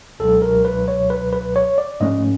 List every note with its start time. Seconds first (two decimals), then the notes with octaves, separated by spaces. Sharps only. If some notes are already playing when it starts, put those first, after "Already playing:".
0.20 C#2 B2 F#3 A4
0.42 A#4
0.65 B4
0.88 C#5
1.10 B4
1.32 B4
1.56 C#5
1.78 D5
2.00 G#2 F3 A3 C#4 D#5